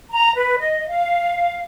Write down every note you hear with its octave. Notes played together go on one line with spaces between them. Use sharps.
A#5
B4
D#5
F5